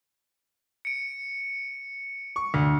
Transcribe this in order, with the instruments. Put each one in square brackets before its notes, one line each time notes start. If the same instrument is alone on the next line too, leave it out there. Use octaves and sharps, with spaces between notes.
[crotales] C#7 D7
[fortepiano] C#6
D2